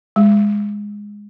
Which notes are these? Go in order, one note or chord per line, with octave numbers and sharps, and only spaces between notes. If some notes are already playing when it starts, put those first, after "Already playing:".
G#3